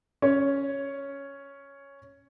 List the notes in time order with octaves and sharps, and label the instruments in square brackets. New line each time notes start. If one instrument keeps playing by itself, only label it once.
[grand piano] C#4 C#5